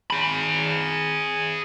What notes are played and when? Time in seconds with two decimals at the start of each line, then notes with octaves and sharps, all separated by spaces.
0.10 G#4 B5